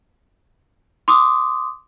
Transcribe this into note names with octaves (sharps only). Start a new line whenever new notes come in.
C6 D6 D#6